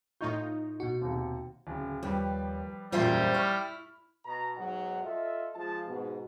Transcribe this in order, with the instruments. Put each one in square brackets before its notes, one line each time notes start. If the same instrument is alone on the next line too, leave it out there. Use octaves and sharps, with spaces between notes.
[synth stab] A2 D#4 F4 [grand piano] D#5 C#6 G6
[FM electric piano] B2 F#4
[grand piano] D#2 C3
D1 C#3
[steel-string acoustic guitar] D#2 [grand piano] F3 G3 B4
[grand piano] E1 F#2 A#2 [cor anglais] G3 [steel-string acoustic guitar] F4 C5 E5
[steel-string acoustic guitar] E4 [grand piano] C#6 F6
[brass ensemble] B2 A#5
B1 G#2 F#3 F#5
F4 A4 D#5 E5
F3 G#3 F4 A5
G#2 B2